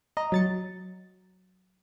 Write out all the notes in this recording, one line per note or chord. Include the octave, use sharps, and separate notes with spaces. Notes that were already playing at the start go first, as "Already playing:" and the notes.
D#5 A#5
F#3 A6 C#7